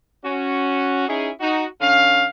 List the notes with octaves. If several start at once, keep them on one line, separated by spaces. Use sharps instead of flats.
C#4 F#4
C#4 D#4 E4 G#4
D#4 F#4
D3 C#4 F5